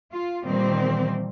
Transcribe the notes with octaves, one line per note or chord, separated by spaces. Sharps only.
F4
A#2 D#3 E3 G3 C4